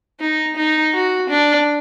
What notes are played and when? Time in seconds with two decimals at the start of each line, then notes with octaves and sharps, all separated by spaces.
0.20 D#4
0.56 D#4
0.94 F#4
1.29 D4